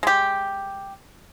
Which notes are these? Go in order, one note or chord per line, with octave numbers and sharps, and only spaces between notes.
G#3 G4